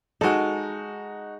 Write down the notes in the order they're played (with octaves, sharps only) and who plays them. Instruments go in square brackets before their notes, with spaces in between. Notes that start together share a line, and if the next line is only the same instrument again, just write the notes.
[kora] G#3 A4 [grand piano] D#4 F#4